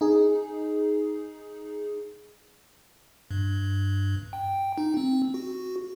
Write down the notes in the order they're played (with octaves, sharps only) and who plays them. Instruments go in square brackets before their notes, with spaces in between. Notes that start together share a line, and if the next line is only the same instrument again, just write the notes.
[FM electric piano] D#4 G#4
[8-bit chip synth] G2
G5
D#4
C4
F#4